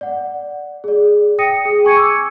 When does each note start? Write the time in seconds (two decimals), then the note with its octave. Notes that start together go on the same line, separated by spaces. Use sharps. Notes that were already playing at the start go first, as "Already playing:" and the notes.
0.01 D5 F#5
0.84 G#4 D5
1.38 G5 D#6 A#6 C#7 D#7
1.65 G#4
1.85 G#5 C#6 G#6 C#7 D#7
1.97 D6 E6